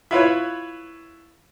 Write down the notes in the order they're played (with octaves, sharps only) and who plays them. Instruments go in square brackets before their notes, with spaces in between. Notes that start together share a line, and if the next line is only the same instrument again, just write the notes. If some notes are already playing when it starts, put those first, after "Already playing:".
[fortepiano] E4 F4 B4 C#5